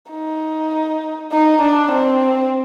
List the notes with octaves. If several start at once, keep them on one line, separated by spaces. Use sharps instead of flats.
D#4
D#4
D4
C4